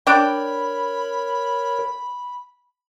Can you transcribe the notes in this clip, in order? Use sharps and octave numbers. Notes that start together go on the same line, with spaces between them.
D4 A#4 C#5 D5 G5 B5